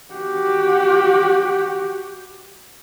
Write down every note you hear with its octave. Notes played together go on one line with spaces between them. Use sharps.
F#4 G4